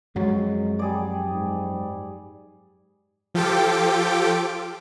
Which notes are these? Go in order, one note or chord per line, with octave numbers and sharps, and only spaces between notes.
F#2 F3 F#3 G#3
G3 G#4 D5
G#2
F3 F4 G4 A4 G5 D6